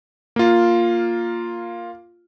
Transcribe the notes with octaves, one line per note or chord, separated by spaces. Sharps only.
A#3 F4